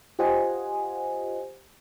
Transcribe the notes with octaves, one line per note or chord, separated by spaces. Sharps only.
F4 G4 C5 D#5 F#5 G#5